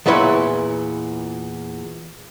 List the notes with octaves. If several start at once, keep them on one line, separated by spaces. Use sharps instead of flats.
E2 A#2 E4 B4 C#5 C6